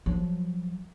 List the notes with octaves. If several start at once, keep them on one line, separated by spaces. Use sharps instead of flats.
F3 F#3